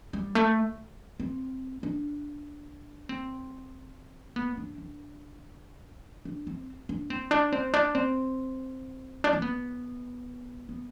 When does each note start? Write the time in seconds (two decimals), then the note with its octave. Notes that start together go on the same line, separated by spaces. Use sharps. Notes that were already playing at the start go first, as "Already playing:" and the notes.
0.13 G3
0.35 A3
1.20 C4
1.83 D4
3.09 C4
4.36 B3
4.57 D4
4.78 D4
6.25 D4
6.47 C4
6.89 D4
7.10 C4
7.31 D4
7.52 C4
7.74 D4
7.95 C4
9.24 D4
9.33 C4
9.42 B3
10.69 B3